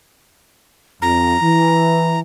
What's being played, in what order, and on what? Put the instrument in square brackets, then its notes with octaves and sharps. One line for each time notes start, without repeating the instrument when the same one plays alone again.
[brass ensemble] F2 [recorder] A#5
[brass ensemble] E3